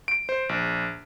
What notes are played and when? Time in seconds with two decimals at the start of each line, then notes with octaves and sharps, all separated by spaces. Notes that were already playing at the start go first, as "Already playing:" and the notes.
0.08 D7
0.29 C5
0.49 A#1